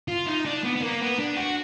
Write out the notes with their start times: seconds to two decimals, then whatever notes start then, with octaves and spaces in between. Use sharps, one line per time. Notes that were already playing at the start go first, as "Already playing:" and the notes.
0.08 F4
0.26 D#4
0.45 D4
0.64 B3
0.76 B3
0.81 A#3
1.01 B3
1.19 D4
1.36 F#4